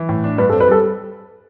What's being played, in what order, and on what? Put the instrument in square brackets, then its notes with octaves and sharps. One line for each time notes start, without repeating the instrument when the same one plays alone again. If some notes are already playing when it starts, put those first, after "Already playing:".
Already playing: [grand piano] E3
A2
D4
[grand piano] G2 [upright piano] B4
[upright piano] A4
[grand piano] C4
[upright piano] B4
[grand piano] G3 [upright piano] A4